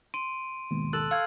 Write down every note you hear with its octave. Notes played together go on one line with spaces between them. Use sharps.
C6 D7 D#7
D#2 G#2 B2
A4 F#6 F#7
F5 C#6 E6 G#6